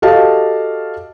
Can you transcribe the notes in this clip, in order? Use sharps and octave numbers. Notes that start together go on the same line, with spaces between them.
F#4 G4 A4 D#5 F5 A5